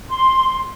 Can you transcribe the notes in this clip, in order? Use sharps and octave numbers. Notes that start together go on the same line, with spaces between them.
C6